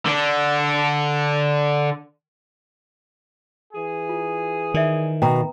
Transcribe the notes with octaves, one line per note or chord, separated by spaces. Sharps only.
D3 D4
E3 G#4
F4
D#3 A#4 D5 E5
B2 G5 A#5